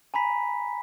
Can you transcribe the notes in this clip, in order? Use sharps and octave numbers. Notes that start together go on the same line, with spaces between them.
G#5 A#5 B5 B6